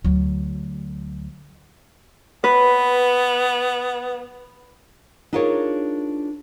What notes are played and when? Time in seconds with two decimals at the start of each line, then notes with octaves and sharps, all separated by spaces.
0.05 D2 F#3
2.44 B3 B4
5.33 D4 D#4 F4 G#4 A#4 C#5